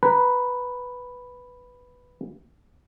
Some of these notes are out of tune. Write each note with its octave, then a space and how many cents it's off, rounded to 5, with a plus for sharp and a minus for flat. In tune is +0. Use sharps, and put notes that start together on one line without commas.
B4 +0 A#5 +15